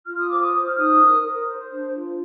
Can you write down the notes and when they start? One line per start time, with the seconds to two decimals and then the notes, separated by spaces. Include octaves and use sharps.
0.06 F4 F6
0.18 D#6
0.29 C5 D6
0.40 D#6
0.54 C5
0.67 F6
0.76 D#4 D#6
1.01 A#4
1.23 A#4
1.47 C5
1.70 D4
1.93 F4